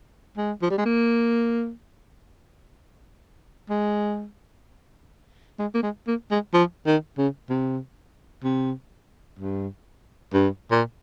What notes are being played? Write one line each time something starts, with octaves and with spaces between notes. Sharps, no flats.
G#3
F3
G3
G#3
A#3
G#3
G#3
A#3
G#3
A#3
G#3
F3
D#3
C#3
C3
C3
G2
G2
A#2